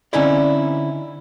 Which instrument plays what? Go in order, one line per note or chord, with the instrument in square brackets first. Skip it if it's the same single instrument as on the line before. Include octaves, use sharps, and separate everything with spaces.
[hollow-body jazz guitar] D3 C4 C#4 D#4 E4 D5